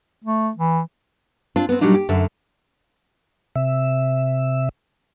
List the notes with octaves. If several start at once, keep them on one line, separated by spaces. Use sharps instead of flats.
A3
E3
C4 D4 F4
B3 C4
A#2 F#3 G3 D4 D#4
G4
F#2 D3 E5
C3 E5